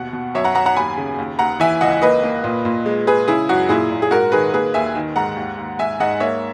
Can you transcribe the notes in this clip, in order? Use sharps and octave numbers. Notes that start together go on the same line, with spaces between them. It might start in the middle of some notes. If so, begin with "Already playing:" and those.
Already playing: D#2 B2 F#5
B2
F#2 C#5 E5
F#5 A#5
F#2 F#5 A#5
F#5 A#5
D#2 G#5 B5
C#3
D#2
D#2 F#5 A#5
E3 E5 G#5
C#2 D#5 F#5
A#3 B4 D#5
A#3
A#2
A#2
G#3
G#3 G#4 B4
C#3 E4 G#4
F#2 F#4
A#2 E4 G#4
A#2
G#4
G#2 F#4 A#4
D#3 G#4 B4
A#3 G#4 B4
D#2 E5 G#5
D#3
G#2 F#5 A#5
D#2
D#2
G#2 E5 G#5
G#2 D#5 F#5
A#3 C#5 E5